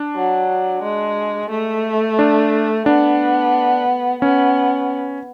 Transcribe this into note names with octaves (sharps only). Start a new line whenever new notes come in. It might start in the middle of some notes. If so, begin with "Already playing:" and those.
Already playing: D4
F#3
G#3
A3
D4
B3 D4
B3 C#4